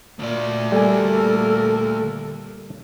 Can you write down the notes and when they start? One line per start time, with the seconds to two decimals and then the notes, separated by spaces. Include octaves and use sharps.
0.19 D2 A#2 D5
0.72 A#2 G3 A#3 A4 A#4 G#5